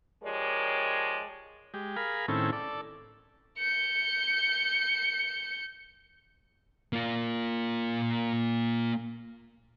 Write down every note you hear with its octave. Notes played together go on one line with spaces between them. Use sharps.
F3 G#3 G4 A#4 C#5 D5
G#3 G4
G#4 A#4 F5 B5
A2 D#3 C4 C#4 E4 A4
A4 D5
G6 C#7
A#3 F4